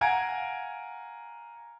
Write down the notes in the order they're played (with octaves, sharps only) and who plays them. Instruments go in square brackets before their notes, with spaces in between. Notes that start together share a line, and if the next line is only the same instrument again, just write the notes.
[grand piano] F5 F#5 G#5 A#5 G#6 D7